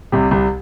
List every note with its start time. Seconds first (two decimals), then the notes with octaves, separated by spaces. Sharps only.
0.12 C2 C3
0.31 C2 C3